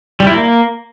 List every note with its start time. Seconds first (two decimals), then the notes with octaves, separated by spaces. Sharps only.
0.20 G3
0.27 E4
0.34 A#3